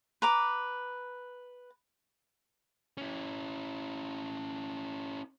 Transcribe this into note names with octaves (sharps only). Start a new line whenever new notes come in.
B4 A#5 D6
C#4 E4